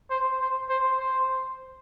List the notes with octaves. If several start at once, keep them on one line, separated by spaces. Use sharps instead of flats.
C5
C5
C5
C5